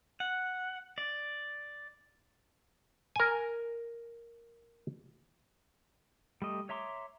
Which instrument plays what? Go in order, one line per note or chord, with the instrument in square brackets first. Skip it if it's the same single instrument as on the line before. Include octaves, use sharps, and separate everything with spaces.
[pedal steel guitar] F#5
D5
[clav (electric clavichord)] A#4 G#5
[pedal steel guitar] G3 A3 D#5
C#5 E5 A#5 C6 D6